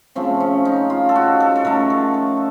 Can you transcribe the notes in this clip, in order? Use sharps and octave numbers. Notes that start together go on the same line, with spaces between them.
C#3 F3 A3 C4
C#4
D#4
F4
A4
F#4
A4
A4
C#3 A3 A#4
A4
A4